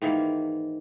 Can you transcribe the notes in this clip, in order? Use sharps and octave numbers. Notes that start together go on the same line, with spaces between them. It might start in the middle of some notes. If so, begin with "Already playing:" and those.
G#2 D#3 E3 A#3